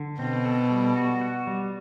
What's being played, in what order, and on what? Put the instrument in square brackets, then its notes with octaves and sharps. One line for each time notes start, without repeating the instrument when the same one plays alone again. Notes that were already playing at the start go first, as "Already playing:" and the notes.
Already playing: [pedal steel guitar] D3
[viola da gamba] B2 [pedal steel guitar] C4
[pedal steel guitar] A4
G3
F#4
F#4
G3